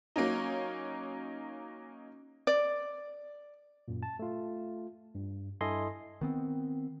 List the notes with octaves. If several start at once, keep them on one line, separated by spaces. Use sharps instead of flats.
F#3 A#3 C#4 D#4
D5
F#2 A#2
A5
A3 F4
G2
G2 E4 A4 D#5 G#5 C6
D#3 B3 C4